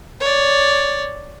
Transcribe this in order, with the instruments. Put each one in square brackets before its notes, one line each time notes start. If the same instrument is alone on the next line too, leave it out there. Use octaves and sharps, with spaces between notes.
[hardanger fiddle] C#5 D5